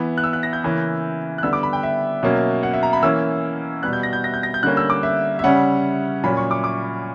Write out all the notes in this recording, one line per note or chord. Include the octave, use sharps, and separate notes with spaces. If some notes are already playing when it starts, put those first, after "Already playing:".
Already playing: E3 B3
F#6
E6
F#6
A#6
G6
C#3 E3 A#3 C#4
F#6
D3 G3 B3 E6
D6
B5
G5
E5
B2 F#3 A#3 C#4
F#5
E5
A#5
B5
E3 A#3 C#4 E6
B2 G3 B3 F#6
G6
A#6
G6
A#6
G6
A#6
G6
D3 G3 A#3 C#4 F#6
E6
D6
E5
E5
C#3 G3 C#4 F#5
A#2 F#3 C#4 B5
C#6
D6
D6